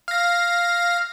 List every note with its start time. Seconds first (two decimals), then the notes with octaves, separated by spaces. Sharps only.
0.08 F5 A#6